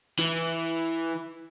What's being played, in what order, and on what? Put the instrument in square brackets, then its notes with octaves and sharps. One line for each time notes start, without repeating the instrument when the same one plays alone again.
[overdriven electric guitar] E3